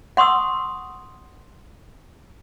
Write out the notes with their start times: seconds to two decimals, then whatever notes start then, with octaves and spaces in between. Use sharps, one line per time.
0.17 F#5 C6 C#6 D#6 E6